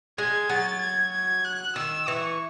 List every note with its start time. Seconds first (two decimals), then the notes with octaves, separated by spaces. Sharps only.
0.18 G#3 G#6
0.49 F#3 A6
0.81 G#6
1.12 G#6
1.45 F#6
1.76 D#3 E6
2.08 E3 C#6